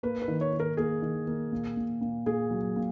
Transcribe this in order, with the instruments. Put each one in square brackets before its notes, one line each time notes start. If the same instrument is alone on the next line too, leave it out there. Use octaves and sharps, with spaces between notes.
[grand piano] A#3 [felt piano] B4
[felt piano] B4
[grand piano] D#3
[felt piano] C#5
[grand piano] D#3
[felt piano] A#4
[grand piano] A#3 [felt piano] G#4
[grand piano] D#3
A#3
A#2
A#2
A#2
[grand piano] A#2 [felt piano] G#4
[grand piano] F#3
A#2